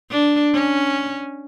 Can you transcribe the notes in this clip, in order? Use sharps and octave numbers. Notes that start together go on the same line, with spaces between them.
D4
C#4